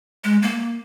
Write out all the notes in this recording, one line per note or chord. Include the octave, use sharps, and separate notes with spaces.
G#3
A#3